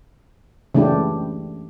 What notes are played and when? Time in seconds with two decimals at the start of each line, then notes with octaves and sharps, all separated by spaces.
0.75 C#3 E3 A3 D4 E4 G4